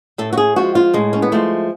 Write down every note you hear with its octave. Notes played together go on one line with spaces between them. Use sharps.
A2 A4
F#4
G#4
F3 G#3 F#4
F4
A2 G#3
C#4
B3
F3 G#3 A3